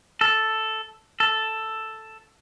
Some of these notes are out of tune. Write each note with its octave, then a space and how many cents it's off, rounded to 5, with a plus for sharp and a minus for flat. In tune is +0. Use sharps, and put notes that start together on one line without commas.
A4 +0
A4 +5